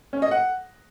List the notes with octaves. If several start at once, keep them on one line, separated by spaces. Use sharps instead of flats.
C#4
D#5
F#5